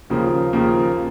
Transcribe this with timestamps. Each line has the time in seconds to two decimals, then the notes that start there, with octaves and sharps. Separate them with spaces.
0.10 D#2 C#3 F3 A#3
0.53 D#2 C#3 F3 A#3